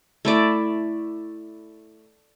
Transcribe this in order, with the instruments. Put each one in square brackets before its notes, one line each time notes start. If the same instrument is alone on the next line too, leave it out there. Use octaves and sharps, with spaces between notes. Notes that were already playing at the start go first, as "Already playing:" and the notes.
[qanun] A3 E4 D5